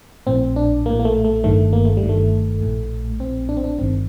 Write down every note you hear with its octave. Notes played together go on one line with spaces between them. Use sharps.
A#1 A2 C4
D4
A#1 A2 A#3
A#3
A3
A3
G1 G2 D#3 A3
A#3
A3
G3
G1 G2 D#3
A3
A#1 A2
A#1 A2 C4
D4
C4
D4
G1 G2 D#3 C4